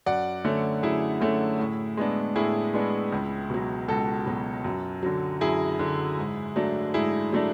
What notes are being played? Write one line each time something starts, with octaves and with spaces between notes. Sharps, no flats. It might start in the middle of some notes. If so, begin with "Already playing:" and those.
F#2 D5 F#5
D3 A3 C#4
F#2 E4 G#4
D3 A3 C#4
A2
G#3 B3 D4
A2 E4 G#4
G#3 B3 D4
C#2
B2 F#3
C#2 F#4 A4
B2 F#3
F#2
D3 F#3
F#2 E4 G#4
D3 F#3
G#2
F#3 A3 D4
G#2 E4 G#4
F#3 A3 D4